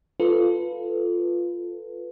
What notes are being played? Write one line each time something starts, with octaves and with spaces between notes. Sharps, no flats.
F4 A4 B4